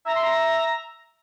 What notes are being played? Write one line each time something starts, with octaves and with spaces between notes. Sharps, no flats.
E5 A#5
C6
A#5